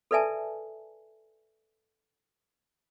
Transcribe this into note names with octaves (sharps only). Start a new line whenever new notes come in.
A4 B4 D5 E5 G#5 A5